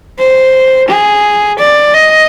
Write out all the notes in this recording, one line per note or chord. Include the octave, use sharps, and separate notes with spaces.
C5
G#4
D5
D#5